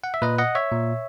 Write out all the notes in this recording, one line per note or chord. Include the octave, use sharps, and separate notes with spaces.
F#5
E5
A#2 B4 D#5
D#5 F#5
C#5 E5
A#2